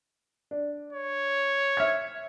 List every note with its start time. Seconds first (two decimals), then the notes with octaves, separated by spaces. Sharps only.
0.51 D4
0.93 C#5
1.77 E5 F6 G#6